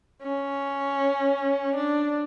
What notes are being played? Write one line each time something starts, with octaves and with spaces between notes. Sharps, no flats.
C#4
D4